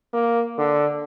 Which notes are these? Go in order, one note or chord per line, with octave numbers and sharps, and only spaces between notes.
A#3
D3